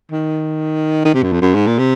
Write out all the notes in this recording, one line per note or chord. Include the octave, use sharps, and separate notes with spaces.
D#3
D#3
C3
F#2
F2
F#2
G#2
A#2
C3